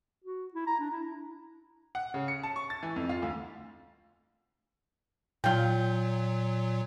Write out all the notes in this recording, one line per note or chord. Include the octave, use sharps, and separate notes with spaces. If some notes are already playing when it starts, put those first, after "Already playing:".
F#4
E4
A#5
D4
E4
F#5
C#3
C#7
A5
C#6
A6
E3
F2
F4
D2
A#2 F#3 F4 G5